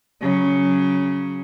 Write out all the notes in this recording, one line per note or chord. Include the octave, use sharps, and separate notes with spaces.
C#3 F#3